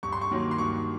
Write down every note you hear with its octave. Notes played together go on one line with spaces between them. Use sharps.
G2 C#6
C6
C#6
D#3 F#3 A#3
C6
G2 C#6